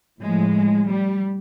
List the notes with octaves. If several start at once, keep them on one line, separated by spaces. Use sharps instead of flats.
A2 F3 G#3
G3